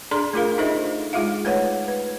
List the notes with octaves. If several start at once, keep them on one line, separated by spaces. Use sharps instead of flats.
D4 G#4 A4 D5 A#5 C6
A3 D4 F4 G#4 A#4 F5
D4 D#4 A4 C5 D#5 E5
G#3 D#4 F4 G#4 E5 F5
A3 B4 C#5 F#5
B4